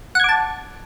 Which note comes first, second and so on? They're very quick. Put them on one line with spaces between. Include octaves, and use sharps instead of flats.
F#5 G#6 D6 A5